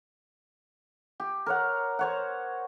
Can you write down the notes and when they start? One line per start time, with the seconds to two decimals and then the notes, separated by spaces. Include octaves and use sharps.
1.20 G4
1.46 A#4 C#5 F#5
1.99 C5 C#5 F#5